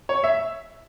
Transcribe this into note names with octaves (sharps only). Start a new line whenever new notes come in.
C#5
E5